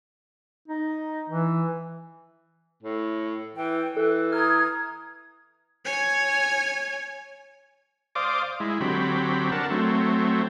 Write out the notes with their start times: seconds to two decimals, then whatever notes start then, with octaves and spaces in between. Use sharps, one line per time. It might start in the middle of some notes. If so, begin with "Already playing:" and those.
0.68 D#4
1.30 E3
2.83 A2
3.56 E3 G5
3.97 E3 A4 F#6
4.32 A#5 D#6 F6 G#6
5.85 C#5 G#5
8.15 C5 D5 F5 D6 D#6
8.60 G#3 E4
8.81 D3 F#3 C4 G4 B5
9.52 D4 A#4 F#5 A5
9.70 F#3 A3 C4